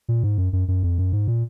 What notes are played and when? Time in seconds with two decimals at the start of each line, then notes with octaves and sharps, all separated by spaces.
0.08 A#2
0.23 G#2
0.38 F#2
0.53 F#2
0.68 F#2
0.83 F2
0.98 F#2
1.13 G#2
1.28 A#2